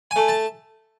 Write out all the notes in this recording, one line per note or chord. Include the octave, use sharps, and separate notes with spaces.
G#5
A3
A5